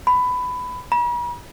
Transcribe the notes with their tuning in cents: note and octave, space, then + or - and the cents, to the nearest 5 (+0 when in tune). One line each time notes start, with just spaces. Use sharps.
B5 +15
B5 -45